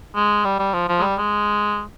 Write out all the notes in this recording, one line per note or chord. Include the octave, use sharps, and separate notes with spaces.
G#3
G3
G3
F3
F3
G#3
G3
G#3